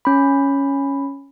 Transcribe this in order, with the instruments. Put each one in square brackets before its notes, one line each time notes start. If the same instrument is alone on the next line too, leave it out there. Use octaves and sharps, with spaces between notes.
[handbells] C#4 B5